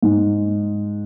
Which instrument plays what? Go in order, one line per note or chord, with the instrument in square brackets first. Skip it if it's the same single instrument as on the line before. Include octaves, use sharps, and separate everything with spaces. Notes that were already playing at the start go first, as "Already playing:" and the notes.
[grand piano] G#2